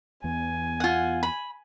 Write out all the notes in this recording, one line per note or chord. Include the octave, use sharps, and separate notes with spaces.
E2 B3 G#5
F4 F#5
B5